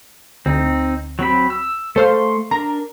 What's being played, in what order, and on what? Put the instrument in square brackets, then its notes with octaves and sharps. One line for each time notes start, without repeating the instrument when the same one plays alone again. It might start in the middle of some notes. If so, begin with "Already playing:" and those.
[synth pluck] D2 [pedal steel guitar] C4 D#4
[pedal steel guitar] F#3 C4 B5
E6
[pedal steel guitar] A3 C6 [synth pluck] A4 C5 F5
[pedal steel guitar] D4 A#4 [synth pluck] A#5